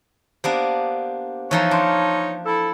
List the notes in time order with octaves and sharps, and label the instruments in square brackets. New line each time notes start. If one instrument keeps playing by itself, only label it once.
[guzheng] A#3 B3 D4 [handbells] G4 C5
[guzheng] E3 F3 A#5 [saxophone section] D#4 C#5
[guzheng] D4 [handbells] A5 C6 F6
[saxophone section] E4 A4 [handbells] E6